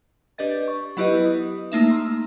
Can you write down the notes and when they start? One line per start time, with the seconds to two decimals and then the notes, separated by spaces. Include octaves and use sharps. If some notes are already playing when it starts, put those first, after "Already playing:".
0.38 D4 G4 B4 D5 D#5 A6
0.68 C#6
0.97 F#3 B3 E4 G4 B4 D#5
1.25 D#6
1.72 A3 A#3 D#4 E5
1.90 A#5 C6 E6